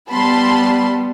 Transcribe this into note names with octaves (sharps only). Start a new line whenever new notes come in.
G3 B3 A5 B5 C6